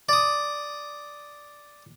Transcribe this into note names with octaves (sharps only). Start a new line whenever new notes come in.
D5 D#6